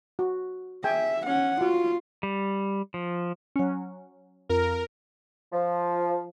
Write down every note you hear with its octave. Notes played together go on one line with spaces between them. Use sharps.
F#4
G#4 E5 G5 G#5
C#4 F#5
F4 F#4
G3
F3
F#3 C#4
F2 A#4
F3